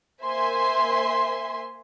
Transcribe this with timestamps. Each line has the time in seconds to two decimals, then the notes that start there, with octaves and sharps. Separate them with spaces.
0.23 A#3 C5 E5 G#5 C6